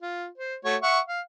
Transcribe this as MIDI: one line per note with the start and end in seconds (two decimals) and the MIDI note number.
0.02 0.27 65
0.38 0.56 72
0.65 0.76 57
0.65 0.76 66
0.65 0.76 73
0.83 1.00 76
0.83 1.00 78
0.83 1.00 85
1.08 1.20 77